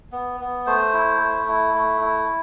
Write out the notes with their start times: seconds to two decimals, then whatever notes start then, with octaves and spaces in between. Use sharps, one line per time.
0.12 B3
0.40 B3
0.66 A3 C5
0.93 E4
1.21 A3
1.48 E4
1.75 A3
2.01 E4